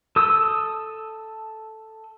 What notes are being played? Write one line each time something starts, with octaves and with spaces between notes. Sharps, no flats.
A4 D#6 E6